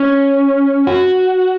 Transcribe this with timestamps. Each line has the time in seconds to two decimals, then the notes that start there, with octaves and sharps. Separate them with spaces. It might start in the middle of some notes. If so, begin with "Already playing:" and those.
Already playing: C#4
0.87 F#4